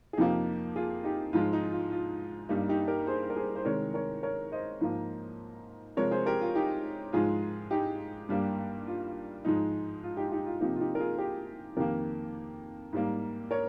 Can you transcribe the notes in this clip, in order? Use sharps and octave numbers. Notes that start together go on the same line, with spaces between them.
G#4
F2 C3 F3 A#3 D#4 G4
F4 G#4
D#4 G4
G#2 F3 G#3 F4
D#4
F4
F4
G2 G3 A#3 D#4
D#4 G4
G4 A#4
G#4 C5
A#4
G#4 C5
C5
C3 D#3 G#3 A#4 C#5
A#4 C#5
A#4 C#5
C5 D#5
G#2 F3 A#3
C3 F3 G#3 A#4 C#5
G#4 C5
G4 A#4
F4
D#4 G4
G#2 F3 G#3 F4 G#4
D#4 G4
G2 G3 A#3
F4
G#2 F3 G#3 D#4
F4
D#4 G4
F4
D#4 G4
F4
C3 F3 A#3 D#4 G4
F4
D#4 G4
A#4
F4 G#4
G4 A#4
F2 D#3 A#3 G4 A#4
G#2 G3 A#3
A#4 C#5